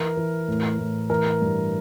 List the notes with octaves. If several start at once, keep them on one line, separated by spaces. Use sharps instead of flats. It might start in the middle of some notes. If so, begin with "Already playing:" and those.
Already playing: E3 A#4
E3
A2
A2
E3 A#4
G2